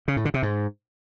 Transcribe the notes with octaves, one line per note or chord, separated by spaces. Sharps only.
C#3
A2
D3
C3
G#2